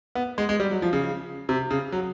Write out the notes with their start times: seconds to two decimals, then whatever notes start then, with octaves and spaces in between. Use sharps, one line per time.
0.15 B3
0.38 G#3
0.49 G#3
0.60 G3
0.71 F#3
0.82 F3
0.93 C#3
1.49 C3
1.71 C#3
1.92 F#3